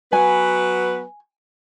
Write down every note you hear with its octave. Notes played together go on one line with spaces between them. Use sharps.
F#3 B3 B4 G#5